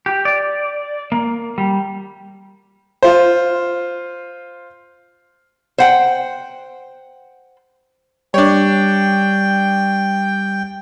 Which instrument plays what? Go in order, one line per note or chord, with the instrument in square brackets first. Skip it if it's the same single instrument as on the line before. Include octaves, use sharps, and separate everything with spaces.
[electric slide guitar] G4
D5
A#3
G3
[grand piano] F4 C5
[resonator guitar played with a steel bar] C5 F#5 G5
[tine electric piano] G3 [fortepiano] D4 C#5 [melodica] G5